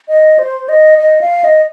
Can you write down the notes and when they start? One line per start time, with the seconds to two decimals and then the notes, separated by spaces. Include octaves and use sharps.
0.08 D#5
0.39 C5
0.69 D#5
0.98 D#5
1.21 F5
1.44 D#5